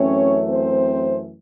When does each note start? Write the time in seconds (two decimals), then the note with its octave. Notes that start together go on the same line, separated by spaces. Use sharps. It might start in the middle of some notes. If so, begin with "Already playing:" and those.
Already playing: F#2 E3 A3 C4 C#4 C#5
0.50 C4 C5